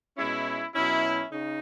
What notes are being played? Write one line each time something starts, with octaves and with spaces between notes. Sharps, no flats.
B2 G#3 C#4 E4
B2 F#3 C#4 E4
C#3 D#4